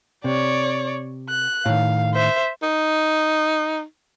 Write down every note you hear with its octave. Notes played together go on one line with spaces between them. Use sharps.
C3 C#5 D5
F#6
A2 D#3 F5
C5 E5
D#4